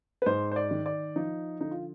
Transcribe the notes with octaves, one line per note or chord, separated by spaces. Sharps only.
B4
G#2 C5
C5
D5
D#3
D5
F3 D#4
D3 D#4
F4